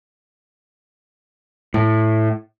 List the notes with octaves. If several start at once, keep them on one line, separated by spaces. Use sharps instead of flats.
A2